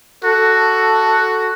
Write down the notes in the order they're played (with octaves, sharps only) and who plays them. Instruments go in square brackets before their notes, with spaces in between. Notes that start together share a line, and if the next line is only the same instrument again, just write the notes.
[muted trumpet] F#4 [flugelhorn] A4